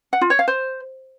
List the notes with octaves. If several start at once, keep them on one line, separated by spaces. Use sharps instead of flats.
F#5
F4
C#5
F5
C5